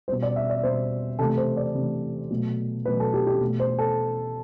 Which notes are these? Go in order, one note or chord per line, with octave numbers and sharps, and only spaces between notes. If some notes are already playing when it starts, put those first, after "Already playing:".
B2 G3 C5
D5
E5
D5
B2 G3 C5
C3 E3 A3 A4
C5
D5
C3 E3 A3
B2 F#3 A3
B2 F#3 A3 B4
A4
G4
G4
B2 A3
C5
A4